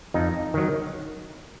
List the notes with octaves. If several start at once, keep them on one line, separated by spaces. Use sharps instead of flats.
F2 D#4
D#3 F#3